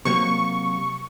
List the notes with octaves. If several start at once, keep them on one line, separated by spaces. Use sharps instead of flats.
C3 F#3 A#3 C#6